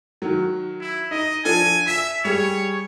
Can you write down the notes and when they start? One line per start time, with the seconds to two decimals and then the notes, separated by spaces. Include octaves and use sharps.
0.22 D#3 F#3
0.81 E4
1.11 D#4 D#5
1.45 F3 D4 A4 G#5
1.87 E5 B6
2.25 G3 G#4 C#5